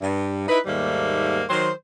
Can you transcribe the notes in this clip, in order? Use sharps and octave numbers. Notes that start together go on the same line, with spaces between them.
G2
D#4 E4 B4
D#2 G#2 G3 A3 A#3
D#3 F#3 C5